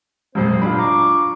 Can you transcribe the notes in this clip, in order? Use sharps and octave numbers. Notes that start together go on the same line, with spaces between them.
D#1 F2 A#2 F#3 G#3 C4 C5
D#3 G3 G#3 D4 F4 B5
A#5 C#6 D6